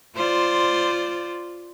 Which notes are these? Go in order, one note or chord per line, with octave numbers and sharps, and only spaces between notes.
F4 C5 D5